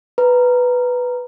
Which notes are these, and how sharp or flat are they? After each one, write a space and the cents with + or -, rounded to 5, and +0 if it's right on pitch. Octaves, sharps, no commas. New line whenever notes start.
B4 +0 A#5 +0